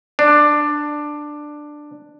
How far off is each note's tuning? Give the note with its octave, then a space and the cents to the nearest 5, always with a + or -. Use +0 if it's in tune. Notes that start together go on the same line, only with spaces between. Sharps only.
D4 +10